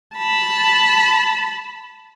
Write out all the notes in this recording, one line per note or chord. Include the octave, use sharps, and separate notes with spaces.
A5 B5